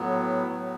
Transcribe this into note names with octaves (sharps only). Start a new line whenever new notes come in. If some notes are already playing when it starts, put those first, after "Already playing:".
Already playing: A2 F#3 B3
A2 F#3